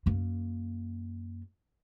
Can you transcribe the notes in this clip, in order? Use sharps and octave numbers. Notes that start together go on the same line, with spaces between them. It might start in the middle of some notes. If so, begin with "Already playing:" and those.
F#2 A#3